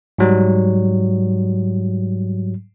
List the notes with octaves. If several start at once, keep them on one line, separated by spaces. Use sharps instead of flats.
G#2 F#3 G3